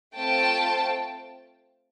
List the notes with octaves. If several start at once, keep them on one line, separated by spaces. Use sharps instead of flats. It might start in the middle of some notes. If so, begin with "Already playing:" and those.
A3 C4 F4 G5 A5